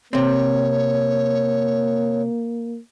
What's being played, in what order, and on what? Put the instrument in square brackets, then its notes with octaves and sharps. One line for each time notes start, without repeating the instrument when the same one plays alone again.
[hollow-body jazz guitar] C3 C4 [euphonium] A#3 [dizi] C#5